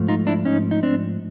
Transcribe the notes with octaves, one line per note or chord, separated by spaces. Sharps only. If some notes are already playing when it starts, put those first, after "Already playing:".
Already playing: G#2 F3 A3
D#4 F4
D4 E4
C#4 D#4
D#4
C4 D4